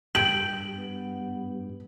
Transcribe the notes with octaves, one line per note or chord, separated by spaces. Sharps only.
G2 G5 F#7
B3